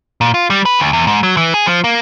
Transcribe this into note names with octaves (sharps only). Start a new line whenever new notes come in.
A#2
F4
G3
B4
D2
E2
G#2
F#3
E3
G#4
F3
A#3